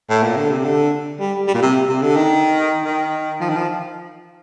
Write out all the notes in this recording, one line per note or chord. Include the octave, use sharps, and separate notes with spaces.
A2
A#2
D3
C3
D3
G3
G3
A#2
C3
C3
D3
D#3
D#3
F3
D#3
F3